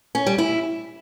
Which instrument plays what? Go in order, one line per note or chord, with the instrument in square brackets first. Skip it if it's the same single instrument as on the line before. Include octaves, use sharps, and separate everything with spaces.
[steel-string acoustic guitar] C#4
G3
E4